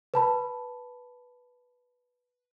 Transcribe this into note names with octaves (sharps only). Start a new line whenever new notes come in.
B4 A5 B5